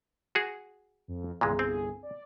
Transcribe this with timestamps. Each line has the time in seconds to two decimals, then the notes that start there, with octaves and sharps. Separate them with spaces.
0.35 F#4 G#4
1.08 F2
1.41 G1 C2 A#2 E3 G#3 G#4
1.59 C4
2.03 D5